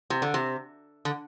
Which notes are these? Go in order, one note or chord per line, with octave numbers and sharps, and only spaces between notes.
C3
D3
C3
D3